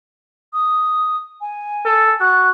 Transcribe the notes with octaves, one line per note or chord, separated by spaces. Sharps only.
D#6
G#5
A4
F#4 F#6